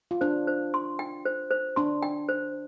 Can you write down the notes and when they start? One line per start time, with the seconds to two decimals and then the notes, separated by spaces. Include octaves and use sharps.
0.11 F4
0.21 D4 C5
0.47 C5
0.74 C6
0.99 G5
1.25 C5
1.51 C5
1.76 D4 C6
2.02 G5
2.29 C5